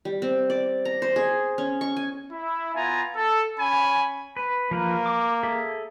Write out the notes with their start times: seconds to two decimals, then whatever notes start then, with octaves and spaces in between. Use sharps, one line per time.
0.05 G3
0.22 C4
0.50 D5
0.85 A#5
1.02 C5
1.16 G#4
1.58 C#4
1.81 C#6
1.97 G#5
2.32 E4
2.75 B3 F4 G#5 A#5
3.16 A4
3.59 C#4 G#5 B5
4.37 B4
4.71 F3 A#3 A#4 B4
5.06 D6
5.43 G#4 A4 E5